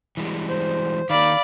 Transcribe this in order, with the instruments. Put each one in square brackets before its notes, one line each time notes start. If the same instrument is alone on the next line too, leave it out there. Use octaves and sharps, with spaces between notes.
[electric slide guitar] E3 G3 G#3
[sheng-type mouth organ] C5
[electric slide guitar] D#3 A#3 [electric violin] D5 B5 [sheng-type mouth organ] F5